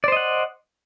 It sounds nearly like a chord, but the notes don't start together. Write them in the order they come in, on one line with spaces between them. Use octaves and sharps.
D5 C5 D#5 F#5